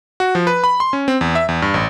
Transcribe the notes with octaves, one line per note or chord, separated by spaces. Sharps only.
F#4
F3
B4
B5
C6
C#4
C4
E2
E5
E2
G2
A1